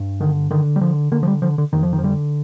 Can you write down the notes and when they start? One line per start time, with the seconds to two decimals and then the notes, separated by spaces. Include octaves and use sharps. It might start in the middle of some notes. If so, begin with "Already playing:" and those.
Already playing: G2
0.20 D3 D#3
0.51 D3 D#3
0.76 G3
0.81 D3 F3
1.12 D3 A#3
1.23 F3
1.28 G3
1.42 D3 F3
1.58 D3
1.73 F2 D#3
1.83 F3
1.93 D#3
1.98 F3
2.03 D3 G3